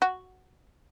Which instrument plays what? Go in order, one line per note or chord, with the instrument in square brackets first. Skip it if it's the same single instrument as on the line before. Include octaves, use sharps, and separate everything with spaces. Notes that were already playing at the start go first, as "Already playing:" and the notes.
[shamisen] F#4